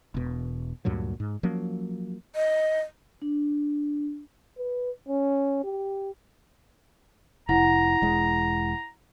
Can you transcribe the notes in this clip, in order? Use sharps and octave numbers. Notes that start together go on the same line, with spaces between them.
E1 B2
D2 G2 A#2 F#3
G#2
F3 F#3 A#3 C#4
D#5
D4
B4
C#4
G4
F1 E4 F#5 A#5
E1 G#3